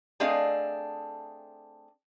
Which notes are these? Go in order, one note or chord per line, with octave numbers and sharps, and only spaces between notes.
A3 C4 D4 G#4 D#5 F5